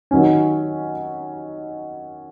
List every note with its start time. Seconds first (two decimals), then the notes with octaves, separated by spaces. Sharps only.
0.11 D#3 F#3 C#4